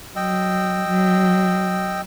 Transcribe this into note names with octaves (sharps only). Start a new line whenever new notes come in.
F#3 D#5 G5 E6
F#3